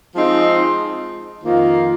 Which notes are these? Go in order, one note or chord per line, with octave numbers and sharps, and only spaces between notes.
F3 G#3 C4 D#4
F2 D#3 A#3 F4